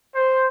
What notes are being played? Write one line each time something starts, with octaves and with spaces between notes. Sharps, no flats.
C5